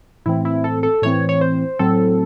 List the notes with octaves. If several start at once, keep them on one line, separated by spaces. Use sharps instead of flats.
A2 E3 C4 E4
E4
A4
A4
A2 E3 C4 C#5
C#5
C5
A2 F#3 C4 A4